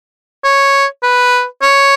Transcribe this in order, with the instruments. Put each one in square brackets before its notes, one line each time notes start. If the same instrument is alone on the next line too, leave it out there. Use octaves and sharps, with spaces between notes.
[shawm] C#5
B4
C#5